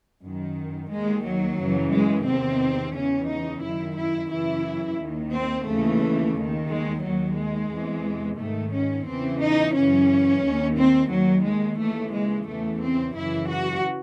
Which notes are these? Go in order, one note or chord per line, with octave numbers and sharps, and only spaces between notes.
F#2 D#3
D#2 D#3 G#3
F#3
F#2 C#3 E3
G#3
E2 C3 D#3 C4
E2 C#3 E3 C#4
D#4
F#2 D#3 E4
E4
F#2 C#3 E3 E4
D#2 D#3
C4
D#2 C#3 E3 A3
D#2 D#3
G#3
D#2 D#3 F#3
G#3
E2 C3 E3
G#2 D#3 A3
C#4
E2 C#3 E3 C4
D#4
F#2 C#3 E3 C#4
D#2 D#3
C4
D#2 D#3 F#3
G#3
D#2 C#3 E3 A3
G#3
E2 C#3 E3 A3
C4
F#2 C#3 E3 E4
F#4